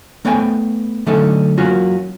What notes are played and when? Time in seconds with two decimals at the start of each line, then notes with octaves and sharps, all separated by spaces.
0.25 A3 B3 C#5 G5 G#5
1.06 D3 F#3 A3 C#4 D#4 A4
1.58 F#3 A#3 C#4 F4 F#4